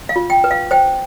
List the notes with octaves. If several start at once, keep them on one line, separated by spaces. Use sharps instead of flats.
F5
F4
G5
B4
F5
C5 G5